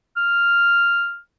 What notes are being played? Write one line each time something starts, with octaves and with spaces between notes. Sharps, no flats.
F6